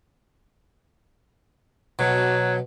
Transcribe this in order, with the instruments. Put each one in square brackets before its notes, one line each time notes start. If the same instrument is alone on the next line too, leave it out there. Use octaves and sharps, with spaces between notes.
[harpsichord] B2 [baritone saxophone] F#3